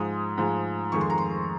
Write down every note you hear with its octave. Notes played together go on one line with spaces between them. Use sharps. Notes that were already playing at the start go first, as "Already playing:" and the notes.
Already playing: G#2 F3 G#3 D#6
G#2 F3 G#3
F2 D#3 G#3 C#6
C6
A#5
C6